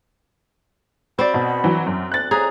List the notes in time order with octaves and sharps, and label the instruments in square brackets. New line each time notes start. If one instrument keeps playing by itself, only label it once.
[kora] C4 C5 D5 [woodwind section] F#4 B5
[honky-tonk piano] B2
E3 F#3
F#2
[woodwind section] D2 [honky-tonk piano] F#6 A6
[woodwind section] A2 F3 G3 [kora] G#4 [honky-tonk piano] A#5